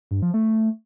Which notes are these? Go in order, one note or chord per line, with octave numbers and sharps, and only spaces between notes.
G2
F3
A3